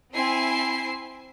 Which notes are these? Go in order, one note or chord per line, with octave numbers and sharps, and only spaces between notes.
C4 E4 G#5 C7